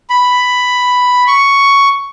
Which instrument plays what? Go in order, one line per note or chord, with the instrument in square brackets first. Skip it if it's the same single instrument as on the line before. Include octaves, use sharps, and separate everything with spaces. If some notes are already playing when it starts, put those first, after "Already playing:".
[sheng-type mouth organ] B5
C#6